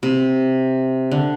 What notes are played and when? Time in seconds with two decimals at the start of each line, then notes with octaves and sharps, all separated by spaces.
0.03 C3
1.11 D3